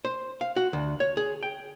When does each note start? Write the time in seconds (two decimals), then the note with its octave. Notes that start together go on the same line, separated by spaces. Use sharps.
0.05 C5
0.41 F5
0.56 F#4
0.73 D2
1.00 C#5
1.17 G#4
1.43 G5